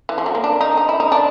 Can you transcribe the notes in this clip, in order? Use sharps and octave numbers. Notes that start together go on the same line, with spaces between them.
E3
F3
F#3
A#3
D4
D#4
D#4
E4
D#4
D4